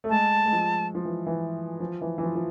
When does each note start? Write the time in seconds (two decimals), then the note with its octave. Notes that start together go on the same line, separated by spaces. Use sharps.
0.04 A3
0.10 G#3 A5
0.46 G#3
0.53 F3
0.95 F3
1.05 E3
1.26 E3
1.80 F3
2.01 E3
2.18 E3
2.23 F3
2.35 F3